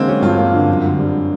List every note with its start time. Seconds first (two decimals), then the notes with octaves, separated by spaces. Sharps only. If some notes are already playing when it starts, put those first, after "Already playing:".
Already playing: D3 E3 G#3 A#3 C4
0.08 F#3 C#4
0.22 G2 F4
0.38 A#3
0.53 D3
0.69 F#2
0.84 D3
0.99 G3